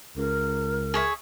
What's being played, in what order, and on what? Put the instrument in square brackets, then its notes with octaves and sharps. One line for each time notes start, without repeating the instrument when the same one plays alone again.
[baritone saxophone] C#2 [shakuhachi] A#4
[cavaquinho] G#4 C#5 E5